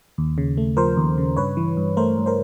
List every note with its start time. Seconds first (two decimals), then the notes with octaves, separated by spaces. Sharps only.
0.18 D#2
0.38 C#3
0.57 A3
0.77 F3 A#4 C5
0.97 D#2
1.18 C#3
1.37 G2 B4 C#5
1.57 E3
1.77 G2
1.97 A3 A#4 C5
2.17 G2
2.26 A#4 C5